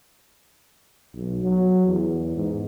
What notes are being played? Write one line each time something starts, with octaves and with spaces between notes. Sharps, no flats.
B1
F#3
E2
G#2